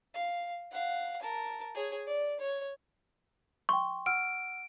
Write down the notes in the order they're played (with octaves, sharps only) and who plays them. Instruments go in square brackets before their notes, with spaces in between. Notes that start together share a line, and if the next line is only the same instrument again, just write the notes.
[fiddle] F5
F5 F#5
A#4 A5
G#4 C#5
D5
C#5
[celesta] G5 C6 [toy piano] C#6
[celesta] F#5 E6 F6 [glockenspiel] D7